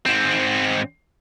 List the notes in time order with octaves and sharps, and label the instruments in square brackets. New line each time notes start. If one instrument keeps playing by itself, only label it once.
[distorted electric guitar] G#2 C4